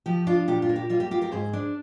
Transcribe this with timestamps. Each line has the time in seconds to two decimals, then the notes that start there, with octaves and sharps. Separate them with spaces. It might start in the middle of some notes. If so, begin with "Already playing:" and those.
0.06 F3 G4
0.27 D4 F4
0.48 A#2 G4
0.62 F4
0.69 A#3
0.76 G4
0.90 G3 F4
1.00 G4
1.11 F4 G4
1.21 G4 A#4
1.32 G#2 G#4 C5
1.53 D4